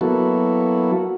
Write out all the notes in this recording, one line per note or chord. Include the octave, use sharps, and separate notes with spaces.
F#3 A#3 B3 E4 F#4 A4